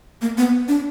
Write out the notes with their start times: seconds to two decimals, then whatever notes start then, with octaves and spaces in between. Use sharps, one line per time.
0.22 A#3
0.38 B3
0.68 D4